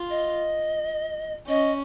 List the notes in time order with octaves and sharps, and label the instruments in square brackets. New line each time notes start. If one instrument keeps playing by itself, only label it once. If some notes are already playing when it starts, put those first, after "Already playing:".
Already playing: [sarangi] F4
[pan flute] D#5
[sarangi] C#4 [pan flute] D#5